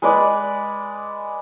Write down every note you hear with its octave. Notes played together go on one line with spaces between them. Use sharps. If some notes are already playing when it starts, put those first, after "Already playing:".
G#3 B4 D5